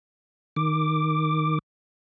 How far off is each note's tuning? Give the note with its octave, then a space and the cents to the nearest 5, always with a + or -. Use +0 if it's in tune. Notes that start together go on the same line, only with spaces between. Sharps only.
D#3 +0 D6 +5